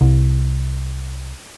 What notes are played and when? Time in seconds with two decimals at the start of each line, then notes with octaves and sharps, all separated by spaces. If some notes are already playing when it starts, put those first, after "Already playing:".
0.01 C2